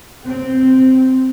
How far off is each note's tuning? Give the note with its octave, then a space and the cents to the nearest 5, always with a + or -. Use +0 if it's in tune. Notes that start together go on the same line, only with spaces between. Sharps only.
C4 -5